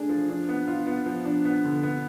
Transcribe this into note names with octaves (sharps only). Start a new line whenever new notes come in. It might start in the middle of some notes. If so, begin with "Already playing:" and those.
Already playing: A3 D4 G#4
F3
D4
B3
F4
B3
F3
D4
B3
D3
B3